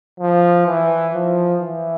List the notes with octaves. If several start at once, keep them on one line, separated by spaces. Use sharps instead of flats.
F3
E3
F3
E3